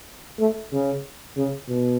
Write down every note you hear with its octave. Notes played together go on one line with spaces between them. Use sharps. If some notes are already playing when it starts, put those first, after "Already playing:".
A3
C#3
C#3
B2